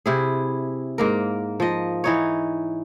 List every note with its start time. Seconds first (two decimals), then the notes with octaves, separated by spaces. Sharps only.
0.06 C3 E4 G#4
0.98 G#2 A#3 A#4
1.60 F3 D#5
2.04 E3 D#4 C#5